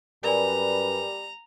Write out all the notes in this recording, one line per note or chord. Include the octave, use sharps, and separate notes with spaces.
F#2 G3 A#4 B4 D5 G#5 A#5